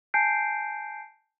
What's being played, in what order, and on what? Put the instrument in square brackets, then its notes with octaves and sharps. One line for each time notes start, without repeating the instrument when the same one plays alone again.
[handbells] G#5 A5 G6 C7 D7